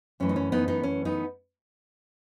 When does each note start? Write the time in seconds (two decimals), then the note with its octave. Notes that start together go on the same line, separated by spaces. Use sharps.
0.20 F#2 E3 A3 C#4
0.29 D#4
0.36 C#4
0.52 B3 D#4
0.68 B3 D#4
0.83 C#4
1.05 B3 D#4